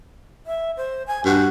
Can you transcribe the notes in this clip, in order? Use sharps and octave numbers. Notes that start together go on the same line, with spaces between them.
E5
C5
G#5
G2 F#4